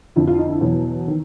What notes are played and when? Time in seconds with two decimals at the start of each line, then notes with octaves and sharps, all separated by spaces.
0.16 F2 D3 F3 E4
0.27 F4
0.38 D#4
0.50 E4
0.61 E2 B2 F#3
1.08 D#3